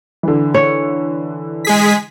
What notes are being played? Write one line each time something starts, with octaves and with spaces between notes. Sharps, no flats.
D3 E3
C#5
G#3 G#4 B6